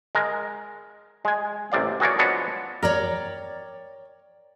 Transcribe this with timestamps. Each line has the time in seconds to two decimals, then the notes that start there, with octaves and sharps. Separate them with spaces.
0.15 G#3 A#4
1.25 G#3 G#5
1.72 A1 C3 D5 F5
2.00 F#4 G#4 A#4 C#5 D5
2.19 F3 B3 D4 F#4 C#5 D#5
2.82 A#4 C#5 D5 G5